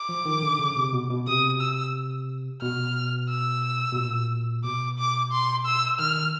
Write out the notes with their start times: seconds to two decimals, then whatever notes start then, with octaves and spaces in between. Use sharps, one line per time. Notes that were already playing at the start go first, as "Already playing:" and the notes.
Already playing: D6
0.09 F3
0.25 D#3
0.43 D3
0.59 C#3
0.76 C3
0.93 B2
1.10 B2
1.27 C3 D#6
1.61 E6
2.62 B2 F6
3.29 E6
3.92 B2
3.97 A#2
4.64 B2 D6
4.99 D6
5.32 C6
5.66 E6
5.99 D#3 F6